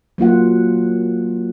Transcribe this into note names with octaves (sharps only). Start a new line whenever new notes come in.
F#3 A#3 F4 F#5